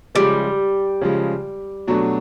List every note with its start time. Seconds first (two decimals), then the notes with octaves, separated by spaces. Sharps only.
0.15 C#3 F3 G3 G#3
1.01 C#3 F3 G#3
1.88 B2 F#3 A3 D4